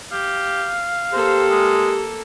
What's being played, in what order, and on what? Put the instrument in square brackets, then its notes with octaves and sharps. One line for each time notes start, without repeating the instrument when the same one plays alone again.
[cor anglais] G4 [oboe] F5
[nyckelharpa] A#3 A4 [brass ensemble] G4 [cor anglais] C5
[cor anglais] G#3